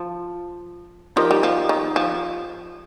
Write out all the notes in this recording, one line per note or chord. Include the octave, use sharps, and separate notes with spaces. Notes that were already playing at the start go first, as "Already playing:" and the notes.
Already playing: F3 F4 A5
F3 D#4 G4 A#4 D#5
G3
F3
D#3
F3